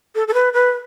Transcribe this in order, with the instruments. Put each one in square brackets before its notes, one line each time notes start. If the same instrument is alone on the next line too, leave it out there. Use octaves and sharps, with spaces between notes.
[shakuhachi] A4
A4
B4
B4